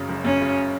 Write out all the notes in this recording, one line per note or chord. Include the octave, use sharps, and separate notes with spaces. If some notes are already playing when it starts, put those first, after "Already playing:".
Already playing: F#2 C#3 G#3
F#1
F#2 C#4
C#3